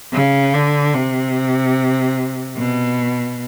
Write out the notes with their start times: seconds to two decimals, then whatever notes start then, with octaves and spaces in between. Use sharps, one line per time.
0.13 C#3
0.54 D3
0.94 C3
2.57 B2